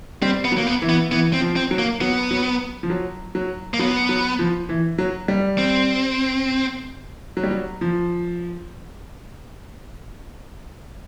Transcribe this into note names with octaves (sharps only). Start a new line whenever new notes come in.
G3 C4
B3
F#3
A#3
B3
E3
B3
E3 B3
C4
F3
C4
F#3
A#3
F#3 B3
F#3
F3
F#3
F#3
A#3
F#3 B3
F#3
F3
E3
F#3
G3
C4
F#3
G3
F#3
F3